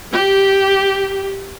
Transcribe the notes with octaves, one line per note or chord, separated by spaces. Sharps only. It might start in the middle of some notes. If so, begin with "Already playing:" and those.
G4